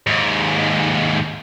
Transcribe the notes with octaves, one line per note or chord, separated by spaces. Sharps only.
D#2 G#2